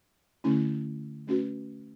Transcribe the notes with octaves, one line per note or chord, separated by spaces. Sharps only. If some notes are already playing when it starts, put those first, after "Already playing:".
D3 A3 C#4 E4
A3 C#4 F#4 B4